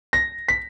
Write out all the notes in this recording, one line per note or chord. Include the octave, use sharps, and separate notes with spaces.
A#6
B6